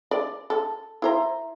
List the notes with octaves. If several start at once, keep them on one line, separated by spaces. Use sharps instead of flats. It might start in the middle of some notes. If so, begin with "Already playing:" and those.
D5
A4
E4 C5 A#5